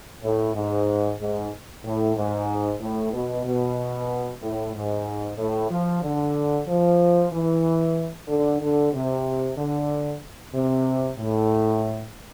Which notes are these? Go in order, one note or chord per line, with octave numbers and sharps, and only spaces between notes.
A2
G#2
G#2
A2
G#2
A2
B2
B2
A2
G#2
A2
F3
D3
F3
E3
D3
D3
C3
D3
C3
A2